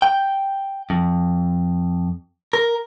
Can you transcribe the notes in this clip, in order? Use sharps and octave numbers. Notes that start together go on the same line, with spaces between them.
G5
F2
A#4